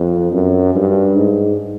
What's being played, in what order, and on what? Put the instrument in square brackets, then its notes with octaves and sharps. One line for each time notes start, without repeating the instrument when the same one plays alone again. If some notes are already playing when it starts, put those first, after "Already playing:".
Already playing: [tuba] F2
F#2
G2
G#2